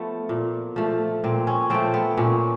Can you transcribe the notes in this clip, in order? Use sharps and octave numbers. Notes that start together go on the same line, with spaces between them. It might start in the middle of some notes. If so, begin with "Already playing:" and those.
Already playing: F3 A3 B3
A#2
F3 A3
A#2 C4
C#4
F3 A3 C4
B3
A#2 C#4